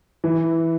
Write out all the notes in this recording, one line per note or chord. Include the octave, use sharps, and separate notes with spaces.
E3